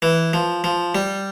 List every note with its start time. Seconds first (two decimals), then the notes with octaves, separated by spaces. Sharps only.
0.02 E3
0.33 F3
0.64 F3
0.95 G3